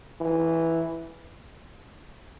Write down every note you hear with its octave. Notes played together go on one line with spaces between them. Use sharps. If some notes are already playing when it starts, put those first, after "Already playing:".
E3